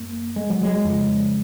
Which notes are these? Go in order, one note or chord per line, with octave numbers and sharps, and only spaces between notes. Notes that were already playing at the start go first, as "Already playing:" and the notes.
Already playing: F#2 A#3
G#3
F#3
G#3
F2 C#3